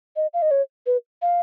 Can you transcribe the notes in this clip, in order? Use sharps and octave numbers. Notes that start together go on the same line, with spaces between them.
D#5
F5
D#5
C#5
B4
F5